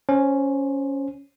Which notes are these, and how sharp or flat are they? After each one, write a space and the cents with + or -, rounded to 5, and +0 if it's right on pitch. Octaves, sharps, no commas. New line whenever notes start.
C#4 +0 C5 +20